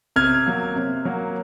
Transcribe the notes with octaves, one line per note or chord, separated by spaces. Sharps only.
C3 F6 G#6
F#3 A#3
C3
F#3 A#3